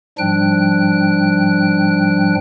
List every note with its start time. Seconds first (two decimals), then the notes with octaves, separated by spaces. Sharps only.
0.18 G#2 F3 G3 D4 G5 F#6